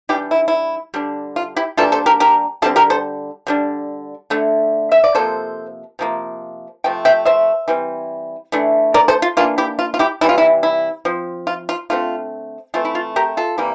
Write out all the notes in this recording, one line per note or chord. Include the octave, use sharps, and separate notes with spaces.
E3 G3 D4 E4 G4
E4
E4
D3 G3 D4
F4
E4 G4
E3 G3 A#3 D4 F4 A4
A4 C5
G4 A#4
G4 A#4
D3 G3 C4 F4 A4
G4 A#4
A4 C5
D3 G3 D4
D3 A3 D4
E5
D5
C3 F3 A#3 A4 C5
C3 F3 A#3
C3 F3 A3 G5
E5 G5
C5 E5
E3 G3 C4
E3 A3 D4
A#4 D5
A4 C5
F4
E3 A#3 D4 F4
E4 G4
F4
F4
E4 G4
C3 E3 G3 E4
F4
E4
E4
F3 C4
F4
F4
D3 A3 C4 F4
E3 A3 C4 F4
E4
F4
G4 A#4
F4 A4
C3 E3 G3 A#3